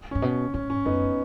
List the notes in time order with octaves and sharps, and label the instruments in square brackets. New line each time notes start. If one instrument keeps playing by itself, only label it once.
[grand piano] C#4
[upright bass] G#2
B2
[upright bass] G#2 [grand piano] C#4
[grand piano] C#4
[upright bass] F#2 [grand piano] B3 D#4